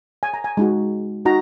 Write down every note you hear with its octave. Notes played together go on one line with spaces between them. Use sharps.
G#5
A#5
G#5
G#3 D#4 F#4
D#4 F#4 A#5